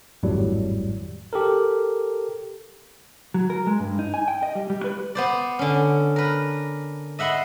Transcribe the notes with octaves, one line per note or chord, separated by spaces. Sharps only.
G#1 F2 A2 F#3 G3
G4 A4 A#4
F#3
A#4
G#3
G2
D#4
G#5
G5
D#5
G3
G3
B4
B3 C5 D5
D3 C#4
A#4 B4
D#5 E5 F#5 B5 C6